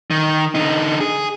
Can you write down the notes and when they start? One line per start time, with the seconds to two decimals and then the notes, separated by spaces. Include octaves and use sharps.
0.11 D#3
0.55 D3 D#4
1.00 G#4